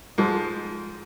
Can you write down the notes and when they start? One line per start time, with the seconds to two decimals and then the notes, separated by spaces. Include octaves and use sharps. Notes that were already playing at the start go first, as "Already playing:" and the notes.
0.18 G#2 F3